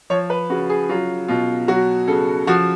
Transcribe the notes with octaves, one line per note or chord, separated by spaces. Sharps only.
F3 C#5
B4
C#3 F#4
G#4
F#3 F4
B2 F4
F#3 F#4
C#3 A4
F3 F#4